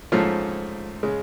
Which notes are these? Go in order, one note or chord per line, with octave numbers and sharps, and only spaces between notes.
G#2 F3 A3 C#4 F4
C#3 G#3